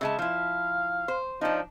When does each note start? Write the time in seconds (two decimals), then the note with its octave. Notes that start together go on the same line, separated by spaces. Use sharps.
0.01 C#3 G#3 E5 A5
0.19 F3 E4 F5
1.08 C5
1.41 F3 D4 D#4